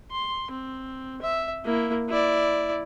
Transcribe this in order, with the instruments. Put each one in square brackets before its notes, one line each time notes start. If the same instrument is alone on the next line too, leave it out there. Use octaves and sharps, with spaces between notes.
[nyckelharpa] C6
C4
E5
A#3 E4
E4 D5